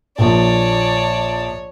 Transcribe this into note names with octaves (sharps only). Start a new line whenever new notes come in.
A#1 F3 A#3 C#5 D5 A5